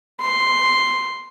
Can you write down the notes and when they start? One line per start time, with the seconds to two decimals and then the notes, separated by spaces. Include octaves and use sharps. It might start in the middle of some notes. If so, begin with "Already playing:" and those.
0.21 C6